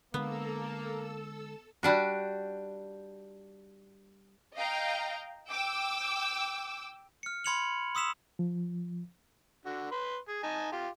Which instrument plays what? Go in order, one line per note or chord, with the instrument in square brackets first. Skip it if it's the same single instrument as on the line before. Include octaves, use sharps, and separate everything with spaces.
[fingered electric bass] D3 G#3 [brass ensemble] A#3 [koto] B3 [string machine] A4 E6
[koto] G3 D4 F#4
[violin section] D#5 F5 G5 A#5
G5 D6 E6
[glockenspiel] F6 C#7
B5 C6 G#6 C#7 F7 F#7
C6 D#6 E6 B6 E7 F7
[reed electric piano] F3
[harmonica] D3 F#4
B4 C6
G#4
D#4 G#5 A5
F4 G4